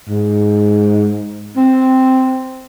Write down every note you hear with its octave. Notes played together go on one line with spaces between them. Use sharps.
G#2
C4